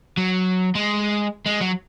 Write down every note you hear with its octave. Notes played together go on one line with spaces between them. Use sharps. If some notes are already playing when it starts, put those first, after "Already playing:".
F#3
G#3
G#3
F#3